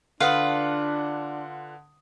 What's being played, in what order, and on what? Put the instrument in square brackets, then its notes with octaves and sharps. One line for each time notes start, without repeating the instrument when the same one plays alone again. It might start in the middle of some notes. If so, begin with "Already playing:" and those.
[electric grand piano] D3 F#5 D#6 [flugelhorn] D4 [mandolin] F4 B4